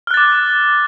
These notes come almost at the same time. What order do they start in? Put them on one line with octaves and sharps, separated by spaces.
F6 F#6 A6 D6